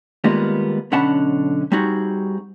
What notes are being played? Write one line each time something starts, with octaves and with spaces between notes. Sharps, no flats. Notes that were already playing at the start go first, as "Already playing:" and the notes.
D#3 G3 G#3 A#3 B3 F4
B1 D3 C#4 F#5 A5 B5
G3 C4 D#4 F#4 G#4